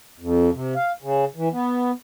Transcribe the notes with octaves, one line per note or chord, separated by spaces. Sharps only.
F2
C3
F5
C#3
E3
B3